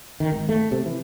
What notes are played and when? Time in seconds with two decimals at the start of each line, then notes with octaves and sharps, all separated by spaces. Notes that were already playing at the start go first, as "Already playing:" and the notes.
0.20 D#3
0.32 G#1
0.49 A3
0.71 C3
0.86 E3